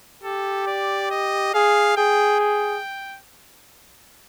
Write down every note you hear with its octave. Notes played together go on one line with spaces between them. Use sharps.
G4 A4
D5
D#5
G#4 F5
G#4 G5
G5